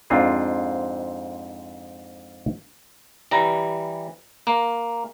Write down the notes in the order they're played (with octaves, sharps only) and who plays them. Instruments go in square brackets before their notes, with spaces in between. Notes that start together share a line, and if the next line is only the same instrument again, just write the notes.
[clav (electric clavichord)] F2 G#2 C4 D4 F4 G#4
E3 G3 A#5
A#3